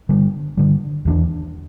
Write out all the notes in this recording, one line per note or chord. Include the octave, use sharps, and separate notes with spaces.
G2 D3 G3
G2 D3 G3
E2 E3 A#3 D4